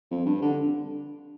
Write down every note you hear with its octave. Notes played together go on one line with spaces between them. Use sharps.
F2
G2
D3